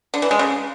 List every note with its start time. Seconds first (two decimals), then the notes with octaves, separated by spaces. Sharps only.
0.14 D3
0.22 E3
0.31 G#3
0.39 C#3